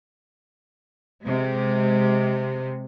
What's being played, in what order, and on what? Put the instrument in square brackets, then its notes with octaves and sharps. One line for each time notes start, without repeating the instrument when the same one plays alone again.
[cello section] C3 G#3